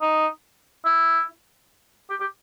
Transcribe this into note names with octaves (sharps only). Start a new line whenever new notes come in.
D#4
E4
G4
G4